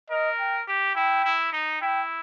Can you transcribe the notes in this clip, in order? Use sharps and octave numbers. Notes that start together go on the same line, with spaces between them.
A#4 D#5
G5
G4
E4 G5
E4
D#4
E4 G5